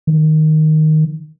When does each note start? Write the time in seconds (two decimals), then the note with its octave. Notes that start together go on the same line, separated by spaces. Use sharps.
0.07 D#3